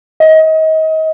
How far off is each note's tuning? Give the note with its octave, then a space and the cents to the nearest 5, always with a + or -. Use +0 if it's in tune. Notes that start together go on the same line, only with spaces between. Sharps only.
D#5 +30